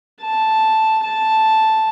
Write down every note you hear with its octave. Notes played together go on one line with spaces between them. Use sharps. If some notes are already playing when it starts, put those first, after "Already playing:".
A5
A5